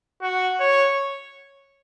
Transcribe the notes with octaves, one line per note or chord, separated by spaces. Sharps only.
F#4
C#5